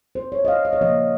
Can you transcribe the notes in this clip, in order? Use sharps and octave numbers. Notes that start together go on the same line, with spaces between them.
C5
C#5
D#5
F5
D#5
C#5
C#3 F3 A#3 D#5